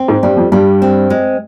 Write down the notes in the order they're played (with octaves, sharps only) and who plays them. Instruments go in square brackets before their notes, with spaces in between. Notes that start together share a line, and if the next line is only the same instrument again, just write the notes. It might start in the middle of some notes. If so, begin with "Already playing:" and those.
Already playing: [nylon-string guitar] C4
[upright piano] G#2
[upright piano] G2 [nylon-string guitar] G3
[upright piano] F2
[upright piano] G2 [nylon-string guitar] G3
[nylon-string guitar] C4
G#3